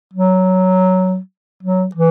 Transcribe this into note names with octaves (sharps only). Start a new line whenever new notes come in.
F#3
F#3
E3